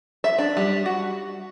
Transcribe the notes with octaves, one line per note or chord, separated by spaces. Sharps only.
E5
D4
G3
F#4